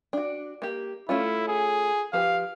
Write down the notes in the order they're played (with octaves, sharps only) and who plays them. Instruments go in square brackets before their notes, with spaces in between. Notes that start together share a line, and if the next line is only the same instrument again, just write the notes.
[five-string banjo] D4 F#4
A#3 G4
[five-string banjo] A3 C#4 F4 [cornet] E4
[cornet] G#4
[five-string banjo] F3 G4 B4 [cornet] F5